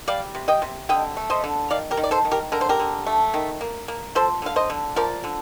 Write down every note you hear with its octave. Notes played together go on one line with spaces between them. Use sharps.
G3 D5 F5
C3
D#5 G5
C3
D3 D#5 G5
A3
C5 D#5
D3
D#3 D5 F5
G4 A#4
D#3
D5
A4 C5
D#3
G4 A#4
D3 A#4
C5
G4 A#4
D3
A3
D#3
A#3
A#3
F3 A4 C5
D3 F5
C5 D#5
D3
F3 A#4 D5
D3